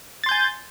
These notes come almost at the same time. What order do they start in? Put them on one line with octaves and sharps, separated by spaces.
A6 C6 G6 G#5